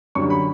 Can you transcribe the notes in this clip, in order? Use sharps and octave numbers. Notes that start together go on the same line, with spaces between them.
F#2 D3 G3 C#6
B5